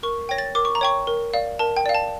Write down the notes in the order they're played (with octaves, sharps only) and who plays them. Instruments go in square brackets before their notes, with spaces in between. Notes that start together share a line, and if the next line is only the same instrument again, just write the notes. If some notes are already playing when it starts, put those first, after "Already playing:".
[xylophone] A#4 C#6
C#5 G5 A#6
A6
A#4 D6
C#6
A#5
C#5 G5 C#6
A#4
D5 F5
A#4 A5
G5
D5 F5
A5